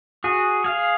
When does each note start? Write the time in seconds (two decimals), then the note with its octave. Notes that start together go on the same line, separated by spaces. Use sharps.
0.24 F#4 G#4
0.64 G#4 F5